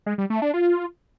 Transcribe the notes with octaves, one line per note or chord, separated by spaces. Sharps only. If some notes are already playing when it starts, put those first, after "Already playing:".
G#3
G3
A3
D4
F4